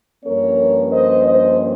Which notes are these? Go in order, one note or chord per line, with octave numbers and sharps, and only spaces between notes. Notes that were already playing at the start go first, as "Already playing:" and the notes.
G2 F3 A#3 C#4 A#4 C#5
C5 D#5
C5 D#5